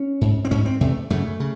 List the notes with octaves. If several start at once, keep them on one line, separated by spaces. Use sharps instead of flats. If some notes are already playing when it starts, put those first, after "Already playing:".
Already playing: C#4
G#2
C4
G#2 C#4
C4
E2 C3 A3
F#2 C#3 A3
C#3